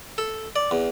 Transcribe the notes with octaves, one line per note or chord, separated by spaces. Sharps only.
A4
D5
E2